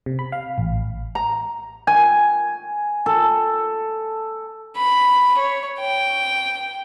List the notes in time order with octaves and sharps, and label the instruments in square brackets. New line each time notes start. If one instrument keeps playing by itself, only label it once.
[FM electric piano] C3
B5
F5
A1
[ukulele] A#5
[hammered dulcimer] G#5
A4
[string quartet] B5
C#5
G5